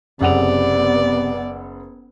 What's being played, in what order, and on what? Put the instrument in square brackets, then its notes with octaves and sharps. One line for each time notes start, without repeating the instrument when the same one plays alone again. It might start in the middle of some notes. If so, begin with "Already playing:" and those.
[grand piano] F#1 F#5 F7 [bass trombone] C3 [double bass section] B3 [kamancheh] D5